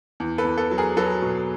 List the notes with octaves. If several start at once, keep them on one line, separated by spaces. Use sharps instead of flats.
E2
A4 B4
E2
A4 B4
F#3
G#4 A#4
F#3 A4 B4
B2